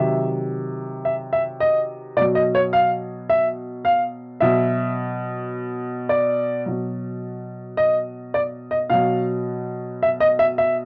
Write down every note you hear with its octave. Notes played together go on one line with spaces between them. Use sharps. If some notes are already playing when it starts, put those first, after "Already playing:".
Already playing: C3 D#3 F#3 E5
E5
E5
D#5
B2 F#3 D5
D#5
C#5
F5
E5
F5
B2 F#3 E5
D5
B2 F#3
D#5
D5
D#5
B2 F#3 F5
E5
D#5
E5
E5